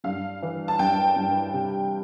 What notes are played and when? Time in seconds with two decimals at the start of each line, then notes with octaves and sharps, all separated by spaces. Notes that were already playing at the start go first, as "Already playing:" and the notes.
0.04 G2 F5
0.42 E3
0.68 A5
0.79 G2 G5
1.16 G2
1.53 C3